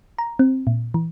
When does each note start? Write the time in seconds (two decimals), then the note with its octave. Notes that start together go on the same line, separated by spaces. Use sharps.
0.19 A#5
0.39 C4
0.67 A#2
0.94 E3